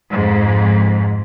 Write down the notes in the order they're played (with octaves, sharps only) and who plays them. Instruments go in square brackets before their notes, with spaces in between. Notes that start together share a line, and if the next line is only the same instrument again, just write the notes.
[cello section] F2 G#2